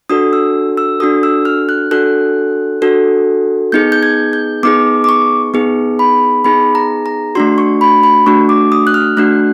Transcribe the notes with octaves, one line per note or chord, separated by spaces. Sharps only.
D4 F#4 A4 D#6
E6
E6
D4 F#4 A4 D#6
E6
F6
F#6
D4 F#4 A4 F#6
D4 F#4 A4
B3 D#4 G#4 G6
G6
G#6
G6
B3 D#4 G#4 D6
D6
C#6
B3 D#4 G#4
B5
B3 D#4 G#4 B5
A#5
A#5
A3 D4 F#4 C6
C#6
B5
B5
A3 D4 F#4 C#6
D6
D#6
F#6
F6
A3 D4 F#4 F#6